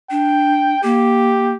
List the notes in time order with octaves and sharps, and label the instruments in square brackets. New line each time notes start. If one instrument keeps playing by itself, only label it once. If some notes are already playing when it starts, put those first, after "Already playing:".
[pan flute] D4 [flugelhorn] G5
[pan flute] A#3 [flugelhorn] G4